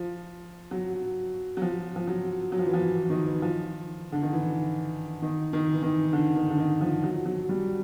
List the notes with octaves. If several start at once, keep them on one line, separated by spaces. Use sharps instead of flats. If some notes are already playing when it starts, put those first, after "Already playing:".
Already playing: F3
F#3
F#3
F3
F3
F#3
F#3
F3
E3
F3
E3
D#3
E3
F3
D3
D#3
E3
D#3
D#3
E3
D#3
D3
D#3
D3
D#3
F3
F#3
F#3
G3